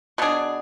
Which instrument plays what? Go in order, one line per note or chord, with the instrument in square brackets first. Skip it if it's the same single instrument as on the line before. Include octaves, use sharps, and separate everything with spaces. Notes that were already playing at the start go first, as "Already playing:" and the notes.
[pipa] B2 B3 D4 G#4